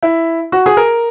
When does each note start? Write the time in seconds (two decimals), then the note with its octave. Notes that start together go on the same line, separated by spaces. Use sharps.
0.03 E4
0.52 F#4
0.66 G#4
0.77 A#4